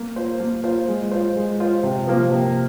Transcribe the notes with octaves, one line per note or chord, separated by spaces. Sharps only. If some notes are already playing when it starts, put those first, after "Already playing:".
Already playing: A#3
F4 C5
A#3
F4 C5
G#3
F4 C5
G#3
F4 C5
C3
F3 A#3 F4
C3